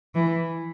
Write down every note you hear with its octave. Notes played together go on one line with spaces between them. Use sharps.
E3